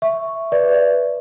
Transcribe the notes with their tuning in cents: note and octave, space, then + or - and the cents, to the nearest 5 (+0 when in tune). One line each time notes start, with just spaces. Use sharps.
E5 +0 C#6 +0
B4 +0 D5 -5